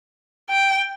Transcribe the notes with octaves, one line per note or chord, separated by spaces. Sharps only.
G5